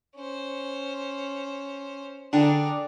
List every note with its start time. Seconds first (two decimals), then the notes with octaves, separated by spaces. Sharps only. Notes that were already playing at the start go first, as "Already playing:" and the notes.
0.16 C#4 C5
2.33 D3 D4 G#4 G5 A5 A#5